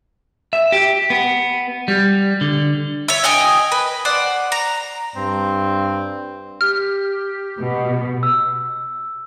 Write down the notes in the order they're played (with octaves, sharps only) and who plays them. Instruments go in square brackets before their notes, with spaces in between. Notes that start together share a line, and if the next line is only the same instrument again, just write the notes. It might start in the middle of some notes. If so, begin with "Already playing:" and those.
[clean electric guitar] E5
G4
B3
G3
D3
[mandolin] C#5 E5
D#5 G5 G#5 D#6
B4
C5 D5 F#5
A#5
[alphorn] G2 [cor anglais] C4
[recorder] G4 [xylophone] F6
[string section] B2
[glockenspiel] E6